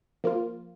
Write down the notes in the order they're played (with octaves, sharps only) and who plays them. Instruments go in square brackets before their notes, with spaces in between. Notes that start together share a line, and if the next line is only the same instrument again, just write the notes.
[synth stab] F3 A#3 F4